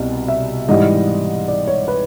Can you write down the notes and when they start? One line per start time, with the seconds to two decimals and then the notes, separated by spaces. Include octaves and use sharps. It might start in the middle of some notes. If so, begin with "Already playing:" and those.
Already playing: C2 B2
0.28 E5
0.69 G#2 E3 G3 D#5
1.48 D5
1.67 C#5
1.88 B4